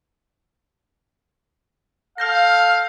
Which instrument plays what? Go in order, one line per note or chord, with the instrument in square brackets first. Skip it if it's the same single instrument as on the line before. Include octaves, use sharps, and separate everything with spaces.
[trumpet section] A4 F5 [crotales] F6 G6 A#6